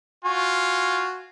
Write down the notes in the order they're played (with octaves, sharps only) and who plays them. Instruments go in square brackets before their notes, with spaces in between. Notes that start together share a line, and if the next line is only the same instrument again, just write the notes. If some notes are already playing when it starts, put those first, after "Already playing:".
[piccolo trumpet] F4 [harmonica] F#4 G#5 C#6